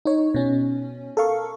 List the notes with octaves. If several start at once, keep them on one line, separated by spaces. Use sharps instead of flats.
D#4 C#5
B2 C#4
A4 A#4 F5 C#6